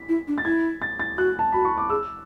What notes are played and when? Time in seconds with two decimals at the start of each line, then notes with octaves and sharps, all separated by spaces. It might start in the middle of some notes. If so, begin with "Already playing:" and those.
Already playing: B6
0.09 E4
0.28 D4
0.38 A6
0.45 E4 G#6
0.82 A6
0.99 A6
1.17 F#4 F#6
1.39 A5
1.52 F#4 B5
1.65 C#6
1.78 D6
1.90 G#4 E6